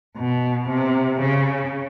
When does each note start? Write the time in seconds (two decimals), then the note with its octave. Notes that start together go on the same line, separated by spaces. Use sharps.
0.17 B2
0.69 C3
1.21 C#3